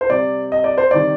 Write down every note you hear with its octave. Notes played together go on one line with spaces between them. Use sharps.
C5
C3 G3 D5
D#5
D5
C5
C3 D#3 G3 D5